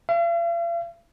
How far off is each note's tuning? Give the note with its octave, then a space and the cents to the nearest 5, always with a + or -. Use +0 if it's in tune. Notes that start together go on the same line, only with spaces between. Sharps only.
F5 -45